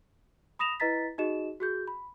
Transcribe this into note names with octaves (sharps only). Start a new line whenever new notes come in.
B5 D#6 A#6 E7 F7
E4 B4 D#5 A#5 A6 B6
D#4 F#4 G#4 D#5 E7
F#4 G#4 G6
B5